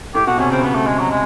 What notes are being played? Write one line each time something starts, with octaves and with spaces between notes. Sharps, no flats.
A2 G4
B2 F#4
C3 C#4
C#3 C4
B3
A3
G#3
F#3
G#3